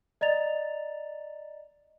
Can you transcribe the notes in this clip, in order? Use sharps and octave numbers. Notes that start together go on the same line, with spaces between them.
D5 D#5 A#5 A6 F7